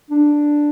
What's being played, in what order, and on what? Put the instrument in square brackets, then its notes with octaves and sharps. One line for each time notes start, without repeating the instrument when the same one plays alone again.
[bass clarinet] D4